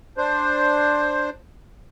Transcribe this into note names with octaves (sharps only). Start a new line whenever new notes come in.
D4 C5